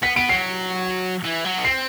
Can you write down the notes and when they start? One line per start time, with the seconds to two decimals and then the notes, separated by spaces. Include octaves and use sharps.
0.02 B3 B6
0.16 B3 D7
0.29 F#3 C7
1.24 E3
1.45 F#3
1.58 B3
1.64 C4 C7